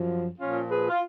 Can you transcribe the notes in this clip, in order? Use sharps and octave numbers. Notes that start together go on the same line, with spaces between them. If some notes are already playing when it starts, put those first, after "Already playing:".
Already playing: F#2 F3
A#2 F3 C#4 F4
G#4 B4
F4